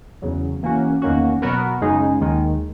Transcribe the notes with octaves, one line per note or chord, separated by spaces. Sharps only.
E2 C#3 F#3
E3 A#3 C#4 F#4
E2 D#3 A#3 C#4 F#4
B2 F#3 B3 F#4 A#4
F#2 C#3 G#3 D#4 G#4
D#2 D#3 G#3